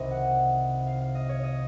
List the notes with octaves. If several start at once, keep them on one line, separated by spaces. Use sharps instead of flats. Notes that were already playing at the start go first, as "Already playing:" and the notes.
Already playing: C2 C3 D#3 D#5
F#5
F5
F5
D#5
C#5
D#5